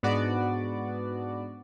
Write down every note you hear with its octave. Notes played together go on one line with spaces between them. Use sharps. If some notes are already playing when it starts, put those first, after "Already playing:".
G#2 B3 D4 F#4 D5